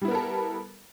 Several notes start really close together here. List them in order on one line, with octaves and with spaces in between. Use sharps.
G3 E4 B3 A#4 A4